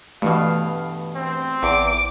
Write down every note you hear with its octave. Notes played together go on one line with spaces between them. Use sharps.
G2 B2 E3 A3 F5
C4
A1 E2 D6